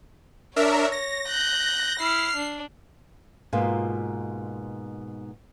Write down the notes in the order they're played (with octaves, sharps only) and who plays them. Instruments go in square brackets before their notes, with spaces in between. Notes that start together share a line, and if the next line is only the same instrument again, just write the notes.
[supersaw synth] D4 A#4 E5 [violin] C#5
[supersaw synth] A#6
[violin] F#6 G6
[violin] E4 F6 [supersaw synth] C7
[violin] D4
[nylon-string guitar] G#2 B2 A#3 F4